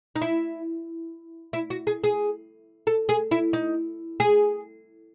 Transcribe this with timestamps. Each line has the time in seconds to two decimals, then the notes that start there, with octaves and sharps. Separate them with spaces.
0.16 D#4
0.21 E4
1.53 E4
1.70 F#4
1.87 G#4
2.04 G#4
2.87 A4
3.09 G#4
3.31 E4
3.53 D#4
4.20 G#4